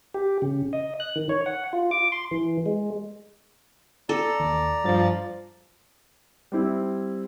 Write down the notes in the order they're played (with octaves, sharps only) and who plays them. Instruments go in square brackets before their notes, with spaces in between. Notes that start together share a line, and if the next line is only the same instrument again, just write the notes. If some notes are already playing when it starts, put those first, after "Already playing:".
[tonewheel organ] G4
C#3
D#5
F#6
D#3
C#5
F#5
F4
D6
C6
E3
G#3
[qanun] A4 [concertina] D5 A#5
[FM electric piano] D#2
[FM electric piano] G2 A6 [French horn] F3
[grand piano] G3 C4 E4